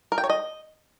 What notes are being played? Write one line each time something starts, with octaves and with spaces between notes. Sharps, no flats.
A#4
G5
C#5
D#5